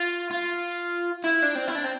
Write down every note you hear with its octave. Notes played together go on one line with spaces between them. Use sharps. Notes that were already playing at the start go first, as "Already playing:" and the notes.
Already playing: F4
F4
E4
D4
C4
E4
D4
C4